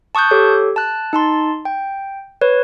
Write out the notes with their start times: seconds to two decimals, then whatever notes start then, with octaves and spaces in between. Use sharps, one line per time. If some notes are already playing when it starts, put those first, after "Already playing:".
0.15 A5 C#6 D#6 F#6 G6
0.31 G4 A4 C#5
0.76 A5 F#6
1.13 D#4 A5 C6
1.65 G5
2.41 B4 C#5